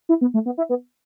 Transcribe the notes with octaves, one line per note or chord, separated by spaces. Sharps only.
E4
B3
A3
B3
E4
B3